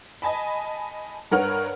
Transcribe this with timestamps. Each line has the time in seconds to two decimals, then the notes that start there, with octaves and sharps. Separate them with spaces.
0.22 D#5 G#5 A5 B5
1.31 G2 A#4 B4 C#5 F#5 F6